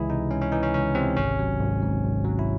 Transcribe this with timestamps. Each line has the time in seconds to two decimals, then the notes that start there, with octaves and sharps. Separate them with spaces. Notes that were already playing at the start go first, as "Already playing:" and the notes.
Already playing: C#2 E3 G#3 E4 G#4
0.09 C3 D#4
0.31 G#3 C#4
0.42 C#4
0.52 E3 D#4
0.63 C#4
0.74 C#2 C#4
0.95 C3 C4
1.16 G#1 C#4
1.39 F#3
1.60 G#1
1.82 G#2
2.04 G#1
2.25 F#3
2.39 E4